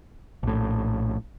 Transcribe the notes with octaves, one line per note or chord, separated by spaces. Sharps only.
A#1 A2